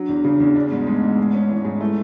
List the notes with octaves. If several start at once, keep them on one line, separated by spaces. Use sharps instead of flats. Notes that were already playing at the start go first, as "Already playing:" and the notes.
Already playing: F#3 D4
E2
C#3 D4
E2 C#4
B3 D4
G#2 B3
G#3 A3
G#2
G#3
C#4
E3 G#3
G#2 G#3
A3 E4